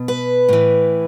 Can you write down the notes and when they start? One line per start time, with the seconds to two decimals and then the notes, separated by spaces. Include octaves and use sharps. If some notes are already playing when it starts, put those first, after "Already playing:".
Already playing: B2
0.08 B4
0.48 A2 E3